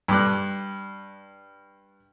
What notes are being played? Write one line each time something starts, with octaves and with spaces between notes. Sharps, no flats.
G2 D6 F#6